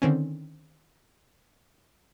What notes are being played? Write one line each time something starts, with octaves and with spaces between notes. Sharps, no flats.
D3 D#3 C4 C#4